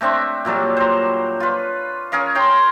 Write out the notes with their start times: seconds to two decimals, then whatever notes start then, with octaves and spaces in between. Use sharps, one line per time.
0.01 A3 C4 D4 E5
0.45 A#2 F#3 G3 A4
0.77 C5 A#5
1.40 F4 B4
2.12 C#4 G#4 A#4 F5
2.35 C#5 G5 A#5 C6